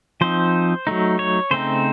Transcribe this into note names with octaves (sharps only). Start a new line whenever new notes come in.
F3 C4 D#4 C5
F#3 A3 D#4
C#5
C#3 A3 C4 D#4 C5